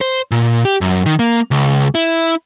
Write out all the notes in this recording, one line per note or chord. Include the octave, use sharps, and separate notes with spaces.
C5
A#2
G4
F#2
D#3
A#3
C#2
E4